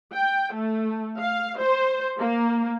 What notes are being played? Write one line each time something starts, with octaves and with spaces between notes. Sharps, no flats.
G5
A3
F5
C5
A#3